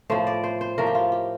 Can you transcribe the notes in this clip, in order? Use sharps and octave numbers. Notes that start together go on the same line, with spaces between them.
A2 F3 C5
D5
C5
C5
A2 F3 A#4
G4
F4
G4